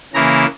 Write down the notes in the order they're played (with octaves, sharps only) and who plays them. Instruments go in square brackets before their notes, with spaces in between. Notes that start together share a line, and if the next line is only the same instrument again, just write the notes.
[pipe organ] C#3 E3 A#3 E4 A#5